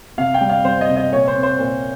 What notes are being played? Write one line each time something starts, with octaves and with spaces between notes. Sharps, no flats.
C3 F5
G5
G3
F5
G3 C5
D#5
C3
D#5
A#2 C#5
C5
C4
C5
A#2